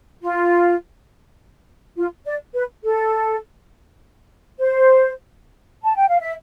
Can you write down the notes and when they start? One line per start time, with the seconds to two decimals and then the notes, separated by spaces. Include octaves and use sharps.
0.22 F4
1.97 F4
2.25 D5
2.54 B4
2.84 A4
4.58 C5
5.84 A5
5.96 G5
6.09 F5
6.20 E5